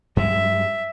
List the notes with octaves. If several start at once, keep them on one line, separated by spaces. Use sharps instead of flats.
G2 F#3 G#3 E5